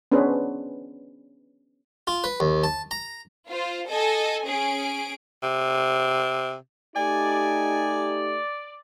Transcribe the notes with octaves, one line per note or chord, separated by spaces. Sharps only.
B3 C#4 D4 G#4 B4 C5
F4
B4
D#2
A5
A#5
F4 C5
A4 D#5 G#5
C#4 G#4 D7
C3
A3 D#4 G4 D5 G#5